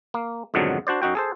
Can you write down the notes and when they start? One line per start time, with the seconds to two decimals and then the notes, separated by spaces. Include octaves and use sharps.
0.14 A#3
0.54 F2 G#2 B2 D3 D#3 F#3
0.87 D4 F#4 C5 D5
1.02 F#2 D#4 F#4 G5
1.15 G#4 A4 C5